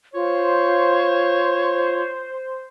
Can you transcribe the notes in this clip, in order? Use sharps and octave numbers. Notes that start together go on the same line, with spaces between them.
F4 C5 C#5